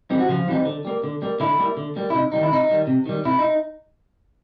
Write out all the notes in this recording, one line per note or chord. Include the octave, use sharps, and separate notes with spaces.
E3 G3 C4 D#4
F#4
C#3 F3 F4
E3 G3 C4 D#4
D3
G3 A#3
D3
G3 A#3
D3 E4
G3 A#3
D3
G3 A#3
E4
C3 D#4
D#3 G3 D#4
E4
C3 D#4
D#3 G3
C3
D#3 G3
C3 E4
D#4